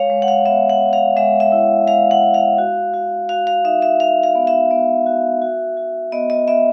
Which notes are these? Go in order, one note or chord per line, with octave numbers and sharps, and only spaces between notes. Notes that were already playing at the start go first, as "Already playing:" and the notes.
Already playing: G#3 C#5 F5
G#3
F#5
F5
B3 E5
F#5
G#3
F5
G#3 E5
E5
E4
G#3 F5
F#5
G#3
F5
F#4
F#4
F#4 F5
F5
D#4 E5
E5
D#4 F5
F5
B3
E5
B3
F#4
F#4
F#4
B3 D#5
D#5
B3 E5